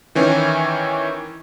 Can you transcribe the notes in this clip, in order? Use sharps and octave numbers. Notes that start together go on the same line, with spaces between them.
D#3 E3 C#4